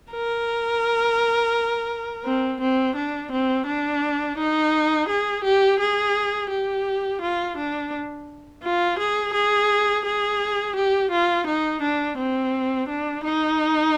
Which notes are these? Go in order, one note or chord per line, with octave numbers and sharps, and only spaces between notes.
A#4
C4
C4
D4
C4
D4
D#4
G#4
G4
G#4
G4
F4
D4
F4
G#4
G#4
G#4
G4
F4
D#4
D4
C4
D4
D#4